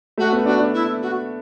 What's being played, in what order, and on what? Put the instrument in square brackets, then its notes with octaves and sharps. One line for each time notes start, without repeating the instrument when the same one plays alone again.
[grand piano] A3 [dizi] F#4
[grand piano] B3
[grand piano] D4 [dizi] F#4
[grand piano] D4
[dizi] E4
F#4